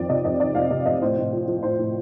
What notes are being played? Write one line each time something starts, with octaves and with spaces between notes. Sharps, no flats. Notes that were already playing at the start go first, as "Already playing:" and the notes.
Already playing: F2 D#3 D5
C3 D#5
F2 D#5
D#3 D5
F2 F5
C3 D#5
F2 D#5
A2 C5
A2
F3
F3
A2 C5
A2